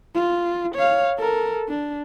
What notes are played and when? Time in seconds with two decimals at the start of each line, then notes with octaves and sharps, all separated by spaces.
0.15 F4
0.75 C#5 F5
1.19 A4 A#4
1.69 D4